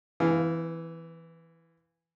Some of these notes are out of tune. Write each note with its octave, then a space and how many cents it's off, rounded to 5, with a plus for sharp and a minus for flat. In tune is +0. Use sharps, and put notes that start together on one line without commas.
E3 +0 C4 -45 F5 +0